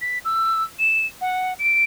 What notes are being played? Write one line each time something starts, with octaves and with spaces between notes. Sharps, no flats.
B6
E6
E7
F#5
D7